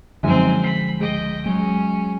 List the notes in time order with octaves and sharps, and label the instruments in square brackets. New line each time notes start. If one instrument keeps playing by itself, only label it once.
[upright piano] F#2 D#4 [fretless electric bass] D3 F3 G#3 [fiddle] C4 G#5
[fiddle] B5 [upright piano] C7
[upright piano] C#2 [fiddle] D#5 G5
[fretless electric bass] F#3 G#3 [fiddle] C#4